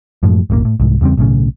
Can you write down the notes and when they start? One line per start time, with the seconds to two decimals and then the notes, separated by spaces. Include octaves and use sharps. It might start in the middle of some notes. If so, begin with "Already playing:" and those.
0.23 F#2 A2 F3 G#3
0.50 D#1 G#1 A3 A#3
0.65 A2
0.80 C2 G#2
1.01 E2 C#3 G3 C4
1.17 B1 A2 C#3